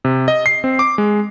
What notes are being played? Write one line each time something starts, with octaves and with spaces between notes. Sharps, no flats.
C3
D#5
C7
C4
D6
G#3